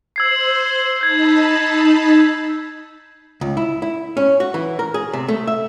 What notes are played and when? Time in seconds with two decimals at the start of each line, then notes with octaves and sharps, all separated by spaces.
0.16 C5 E6 G#6 C7
1.01 D#4 A5 B5 G6 G#6
3.41 C#2
3.57 E4
3.82 E4
4.17 C#4
4.40 F#4
4.54 E3
4.79 A#4
4.94 G#4
5.13 C3
5.28 A3
5.47 E5